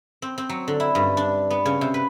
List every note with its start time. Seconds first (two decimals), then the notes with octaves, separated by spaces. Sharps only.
0.22 C4
0.38 C4
0.49 F#3
0.68 D3
0.80 E4
0.95 G2
1.17 D4
1.50 B3
1.65 C#3
1.81 C3
1.94 B4